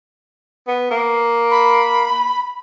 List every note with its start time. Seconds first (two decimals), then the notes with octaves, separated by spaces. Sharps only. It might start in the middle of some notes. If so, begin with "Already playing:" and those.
0.68 B3
0.91 A#3
1.50 B5